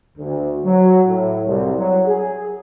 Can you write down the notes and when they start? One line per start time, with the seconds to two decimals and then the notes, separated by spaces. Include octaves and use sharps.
0.18 D2
0.65 F#3
1.07 A2
1.46 C2
1.77 F#3
2.06 G#4